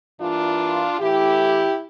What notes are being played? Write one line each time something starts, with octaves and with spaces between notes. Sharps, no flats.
G2 E3 A#3 D4 F4
A2 E3 A3 E4 G4